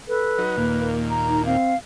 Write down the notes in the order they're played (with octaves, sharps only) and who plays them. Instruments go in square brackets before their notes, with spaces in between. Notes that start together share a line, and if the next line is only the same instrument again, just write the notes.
[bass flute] A4 [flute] B4
[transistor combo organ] F#3 D#4
[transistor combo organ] D#2 A#2 [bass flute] A#3
[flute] A#5
[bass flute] D#4
[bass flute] C4 [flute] F5